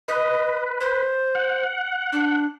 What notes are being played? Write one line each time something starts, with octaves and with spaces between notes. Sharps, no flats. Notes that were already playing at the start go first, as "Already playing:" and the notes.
B4 D#5
C5
F#5
D4